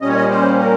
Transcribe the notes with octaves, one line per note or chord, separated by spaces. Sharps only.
A#2 G3 C#4 D#5
C#5
D#5
C5
A#4